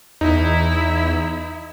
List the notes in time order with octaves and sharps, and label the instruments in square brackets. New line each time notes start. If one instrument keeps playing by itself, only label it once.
[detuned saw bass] E2 [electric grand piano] D#4 [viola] E4